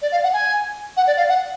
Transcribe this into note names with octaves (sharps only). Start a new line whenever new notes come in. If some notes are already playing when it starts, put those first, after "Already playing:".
D5
F5
F#5
G#5
F#5
D5
F5
F#5